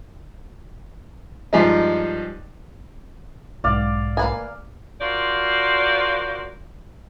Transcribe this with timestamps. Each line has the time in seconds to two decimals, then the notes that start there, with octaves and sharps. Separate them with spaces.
1.53 G2 F3 G#3 D#4
3.64 B1 G#2 D5 F5
4.17 A#3 B4 G#5
5.00 F4 F#4 A#4 C5 D5